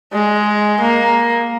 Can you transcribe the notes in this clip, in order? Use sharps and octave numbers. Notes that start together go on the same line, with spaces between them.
G#3
A#3